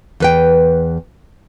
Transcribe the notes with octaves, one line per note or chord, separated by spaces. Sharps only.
E2 B4 G5